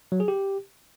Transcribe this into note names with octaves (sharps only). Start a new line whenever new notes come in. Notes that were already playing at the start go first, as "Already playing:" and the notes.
F#3
G#4
G4